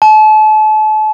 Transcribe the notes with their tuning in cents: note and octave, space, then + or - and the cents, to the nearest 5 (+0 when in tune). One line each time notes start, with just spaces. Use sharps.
A5 -35